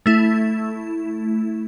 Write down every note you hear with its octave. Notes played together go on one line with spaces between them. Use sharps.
A3 E4